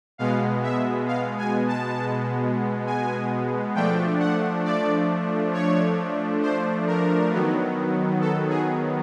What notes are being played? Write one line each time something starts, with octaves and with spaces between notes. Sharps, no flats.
B2 G#3 B3 F5
E5
F5
G#5
A5
G#5
F3 A3 D4 G5
F#5
D5
C#5
C5
A#4
D#3 F#3 B3
A4
G#4